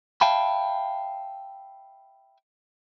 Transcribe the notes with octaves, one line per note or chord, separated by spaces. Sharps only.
E5 F5 G5 A5 B5